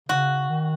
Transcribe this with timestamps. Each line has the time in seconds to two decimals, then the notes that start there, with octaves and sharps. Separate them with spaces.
0.09 C#3 F#4
0.50 D#3